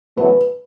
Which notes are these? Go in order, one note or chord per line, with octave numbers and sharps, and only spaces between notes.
E2 C#3 F#3 A3 B4